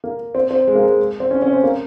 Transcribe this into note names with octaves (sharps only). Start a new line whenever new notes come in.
A#3
C4
C4
G#3
A#3
G#3
C4
C#4
C#4
C4
A#3